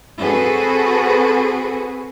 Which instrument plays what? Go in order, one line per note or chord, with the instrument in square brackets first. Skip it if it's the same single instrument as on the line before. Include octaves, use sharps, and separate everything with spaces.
[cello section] C4 F#4 G#4 A4 B4